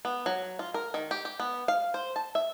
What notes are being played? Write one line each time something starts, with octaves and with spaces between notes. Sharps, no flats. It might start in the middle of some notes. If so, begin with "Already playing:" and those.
B3
F#3
F4
A#4
D#3
G4
G4
B3
F5
C5
A5
E5